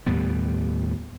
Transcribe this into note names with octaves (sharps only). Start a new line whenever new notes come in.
D#2 A2 G3 B3